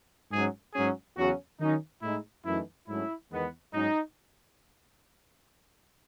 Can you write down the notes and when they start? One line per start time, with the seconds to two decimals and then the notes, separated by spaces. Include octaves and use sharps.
0.32 G#2 F#3 C#4 G#4
0.74 G#2 F#3 C#4 G#4
1.17 E2 C#3 F#3 C#4 F#4
1.60 D#3 F#3 C#4 D#4
2.02 A2 G#3 D#4 E4
2.45 F#2 E3 A3 D#4 E4
2.88 G#2 F#3 A3 C#4 E4
3.31 E2 D#3 G#3 B3
3.73 G#2 F#3 C#4 D#4